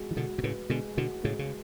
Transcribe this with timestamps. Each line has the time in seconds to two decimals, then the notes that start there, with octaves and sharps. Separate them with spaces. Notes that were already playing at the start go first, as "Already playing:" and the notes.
Already playing: G#3 F#4
0.11 E3
0.17 B2 D3 F#4
0.38 B2
0.43 A2 C#3 B4
0.70 B2 D3 G#3
0.97 B2 D3 F#4
1.24 A2 C#3 G#3
1.39 C#3